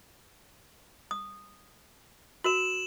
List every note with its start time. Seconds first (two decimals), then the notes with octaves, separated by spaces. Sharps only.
1.11 D#6
2.44 F#4 A#4 E7 F#7